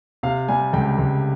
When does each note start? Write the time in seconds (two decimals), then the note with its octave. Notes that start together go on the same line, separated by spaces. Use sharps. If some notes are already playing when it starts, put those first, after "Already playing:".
0.23 C3 F5
0.48 G3 G#5
0.73 C#2 G5
0.99 C#2